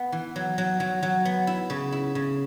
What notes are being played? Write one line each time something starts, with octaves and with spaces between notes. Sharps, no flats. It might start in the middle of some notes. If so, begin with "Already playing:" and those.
Already playing: B3
E3
F#3
F#3
F#3
F#3
B3
E4
C#3
E4
C#3